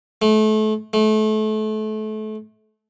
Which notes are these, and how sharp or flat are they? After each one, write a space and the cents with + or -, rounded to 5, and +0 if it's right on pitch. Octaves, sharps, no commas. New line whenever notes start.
A3 -30
A3 -30